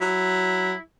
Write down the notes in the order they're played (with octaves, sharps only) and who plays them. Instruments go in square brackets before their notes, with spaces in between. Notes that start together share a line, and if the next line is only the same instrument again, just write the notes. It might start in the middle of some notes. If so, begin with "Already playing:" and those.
[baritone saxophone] F#3 [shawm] E4